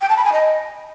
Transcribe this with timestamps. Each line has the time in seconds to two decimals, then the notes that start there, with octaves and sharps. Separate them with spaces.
0.01 G5
0.09 A5
0.17 B5
0.25 G#5
0.32 D#5